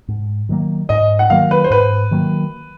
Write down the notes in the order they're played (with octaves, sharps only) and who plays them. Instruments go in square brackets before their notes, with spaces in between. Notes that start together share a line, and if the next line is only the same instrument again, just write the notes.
[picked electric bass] G#2
D#3 F#3 A#3
[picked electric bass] G#2 [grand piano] D#5
[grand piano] F#5
[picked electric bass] D#3 F#3 A#3 [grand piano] F5
[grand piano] B4
C5
[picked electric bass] G#2 [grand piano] B4
[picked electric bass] D#3 F#3 A#3